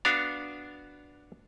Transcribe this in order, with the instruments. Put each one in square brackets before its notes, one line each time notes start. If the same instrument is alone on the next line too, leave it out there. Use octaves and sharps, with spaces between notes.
[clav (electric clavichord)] B3 D4 F#4 F5